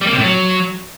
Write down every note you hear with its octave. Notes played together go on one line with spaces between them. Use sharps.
G3
A#3
C3
A2
F#3